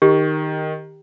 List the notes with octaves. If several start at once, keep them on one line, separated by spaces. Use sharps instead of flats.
D#3 G4